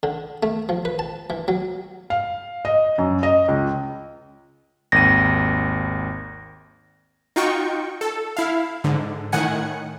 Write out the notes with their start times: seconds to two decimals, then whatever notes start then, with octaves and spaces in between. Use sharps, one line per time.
0.03 D3
0.43 A3
0.69 F3
0.85 B4
0.99 A5
1.30 E3
1.48 F#3
2.10 F5
2.65 D#5
2.98 F#2
3.23 D#5
3.48 C#2
4.92 G#1 D#2 A#6 D#7
7.36 D#4 F4 F#4 G5 C#6
8.01 A4
8.37 E4 F5
8.84 G#2 D3
9.32 A2 D#3 F#5 G#5 C#7